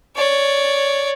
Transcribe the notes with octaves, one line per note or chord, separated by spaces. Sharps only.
C#5 D5